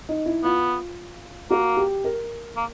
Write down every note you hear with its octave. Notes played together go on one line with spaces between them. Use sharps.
D#4
E4
B3 F4
A#3 F#4
G4
A#4
A#3